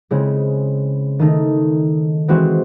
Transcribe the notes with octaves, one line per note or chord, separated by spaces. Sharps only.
C#3 G#3 C4 E4 G#4
D#3 A3 D#4
E3 G#3 C4 F#4